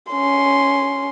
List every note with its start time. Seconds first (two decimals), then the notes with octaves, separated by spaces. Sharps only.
0.11 C#4 C6